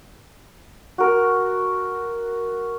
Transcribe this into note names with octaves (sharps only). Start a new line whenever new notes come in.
F#4 A#4